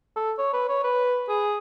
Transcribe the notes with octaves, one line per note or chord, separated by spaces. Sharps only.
A4
C#5
B4
C#5
B4
G#4